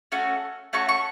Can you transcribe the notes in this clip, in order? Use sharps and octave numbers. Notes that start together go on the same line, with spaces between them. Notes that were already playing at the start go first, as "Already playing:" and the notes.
A3 C#4 F#4
A3 C#4 F#4 C#6
C#6